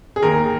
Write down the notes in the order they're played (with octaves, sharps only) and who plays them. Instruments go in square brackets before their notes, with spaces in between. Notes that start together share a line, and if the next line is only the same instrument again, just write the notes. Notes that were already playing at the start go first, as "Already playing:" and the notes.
[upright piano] G#4
D#2 A#4